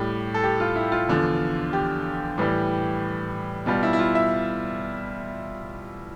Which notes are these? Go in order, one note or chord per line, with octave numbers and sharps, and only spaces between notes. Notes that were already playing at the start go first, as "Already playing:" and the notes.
Already playing: A2 G3 G4
A4
G4
F4
E4
F4
E2 D3 F3
G4
A2 E3 G3
B2 G3 F4
E4
E4
F4
E5